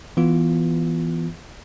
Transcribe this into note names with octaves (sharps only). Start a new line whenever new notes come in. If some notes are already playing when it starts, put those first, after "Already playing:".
E3 B3 F4